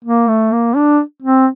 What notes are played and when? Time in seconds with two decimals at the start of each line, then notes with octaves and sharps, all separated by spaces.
0.04 A#3
0.28 A3
0.52 A#3
0.76 D4
1.22 C4